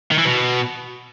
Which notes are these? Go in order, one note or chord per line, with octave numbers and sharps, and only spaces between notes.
D#3
E3
B2